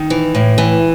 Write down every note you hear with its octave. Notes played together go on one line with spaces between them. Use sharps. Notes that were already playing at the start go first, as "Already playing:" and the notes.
Already playing: D#3
E3
A2
E3